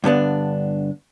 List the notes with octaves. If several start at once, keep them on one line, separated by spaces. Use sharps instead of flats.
G2 D3 B3 D4